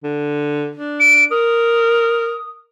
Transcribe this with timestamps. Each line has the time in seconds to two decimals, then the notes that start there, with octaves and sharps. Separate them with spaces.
0.04 D3
0.77 D4
1.00 D7
1.31 A#4 D#6